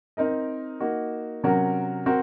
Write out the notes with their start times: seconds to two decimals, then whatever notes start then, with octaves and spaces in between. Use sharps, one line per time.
0.17 C4 D#4 A#4 D#5
0.80 A#3 D#4 F#4
1.43 C3 F#3 C#4 F#4 A#4
2.06 C4 F#4 A#4